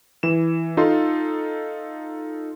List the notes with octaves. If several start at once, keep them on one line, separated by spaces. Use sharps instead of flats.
E3 E7
D#4 F4 A4 C6